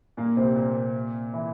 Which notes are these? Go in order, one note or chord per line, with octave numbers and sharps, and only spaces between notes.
A#2 A#3
C3 C4
A#2 A#3
E3 E4